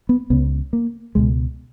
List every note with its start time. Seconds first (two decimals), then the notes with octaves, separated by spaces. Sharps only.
0.09 B3
0.30 C#2 C#3 B3
0.73 A#3
1.15 C#2 B2 G#3